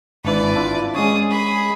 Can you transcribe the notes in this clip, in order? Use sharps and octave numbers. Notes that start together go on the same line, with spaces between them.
G#1 D4 E4 B4 D5
D4 E4 F4
G#3 C#4 G#4 C#5 D#6
G#4 B5